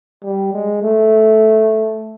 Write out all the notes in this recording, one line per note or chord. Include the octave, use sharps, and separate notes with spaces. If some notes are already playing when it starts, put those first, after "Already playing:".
G3
G#3
A3